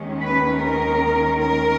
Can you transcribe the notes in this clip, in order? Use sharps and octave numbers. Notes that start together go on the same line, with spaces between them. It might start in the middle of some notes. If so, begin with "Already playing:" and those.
Already playing: D#2 D#3 G#3 C#4
B4
A#4
A#4